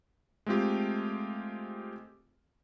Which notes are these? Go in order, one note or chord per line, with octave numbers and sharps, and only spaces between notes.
G#3 A3 C4 F4 G4